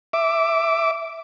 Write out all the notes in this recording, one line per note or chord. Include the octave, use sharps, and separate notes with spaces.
E5 D6